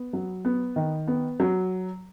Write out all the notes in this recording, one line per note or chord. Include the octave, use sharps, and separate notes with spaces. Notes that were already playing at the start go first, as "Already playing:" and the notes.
Already playing: B3
F#3
B3
D#3
B3
F#3